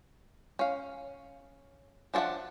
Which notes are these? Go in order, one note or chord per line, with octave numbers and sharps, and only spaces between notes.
C#4 F5
F3 D4 A4 E5 F#5